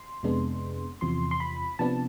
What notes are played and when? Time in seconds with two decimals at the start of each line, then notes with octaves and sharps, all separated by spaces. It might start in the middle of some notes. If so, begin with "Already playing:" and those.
Already playing: C6
0.23 F2 C3 G#3 B3 D4
1.01 E2 C3 F3 C6
1.31 C6
1.40 B5
1.79 C3 F3 B3 D4 A5